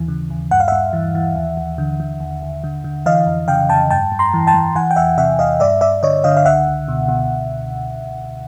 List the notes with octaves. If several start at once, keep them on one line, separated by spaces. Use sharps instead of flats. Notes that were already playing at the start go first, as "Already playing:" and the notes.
Already playing: D#2 E3
C#3
D#2
G2 F#5
F5
G2 E5 F#5
E3
E3
D#2
D#2
D3
D3
D#2
D#2
D3
D3
E3 D#5 F5
F2
C#3 F5 G5
F2 G5 A5
G2 G5 A5
G2
A#5 C6
E3
G5 A5
E3
E3 F#5 G#5
G5
E2 E5 F#5
C3 E5 F#5
E2 D#5 F5
G2 D5 E5
G2 D5 E5
D3 C#5 D#5
D3 D#5 F5
F5
C#2 E5 F#5
C#2
B2
B2